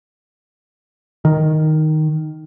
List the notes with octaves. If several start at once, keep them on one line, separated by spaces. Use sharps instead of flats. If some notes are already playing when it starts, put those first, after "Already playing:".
D#3